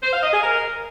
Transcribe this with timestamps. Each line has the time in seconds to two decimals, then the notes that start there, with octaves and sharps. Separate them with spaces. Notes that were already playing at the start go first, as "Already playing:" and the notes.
0.03 C5
0.13 F5
0.23 D#5
0.33 G#4
0.43 A#4